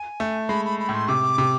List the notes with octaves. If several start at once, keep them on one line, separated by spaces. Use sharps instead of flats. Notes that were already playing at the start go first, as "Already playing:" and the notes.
Already playing: G#5
A3
G#3 B5
B5
B5
A2
C6
C3 D6
C3